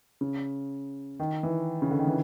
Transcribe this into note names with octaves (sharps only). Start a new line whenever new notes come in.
C#3
D#3
E3
C#3
D3
D#3
E3